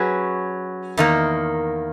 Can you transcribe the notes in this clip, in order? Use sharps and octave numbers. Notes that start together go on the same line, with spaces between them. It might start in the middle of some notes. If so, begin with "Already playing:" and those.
Already playing: F#3 C#4 G#4 B4
E2 D#3 A#3